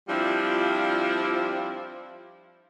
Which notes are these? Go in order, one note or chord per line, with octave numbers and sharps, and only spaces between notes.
F3 G3 C4 D4 E4 F4